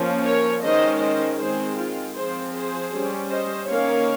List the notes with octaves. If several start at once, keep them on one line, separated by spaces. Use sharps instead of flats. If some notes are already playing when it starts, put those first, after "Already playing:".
Already playing: F3 A#3 C#4
A#4 C#5
D#3 G#3 C#4 C5 D#5
C5 D#5
D#3 G#3 C4 G#4 C5
F4
F3 C4 G#4 C5
G#4 C5
G3 C#4
C5 D#5
D#3 A#3 C#4 C#5 F5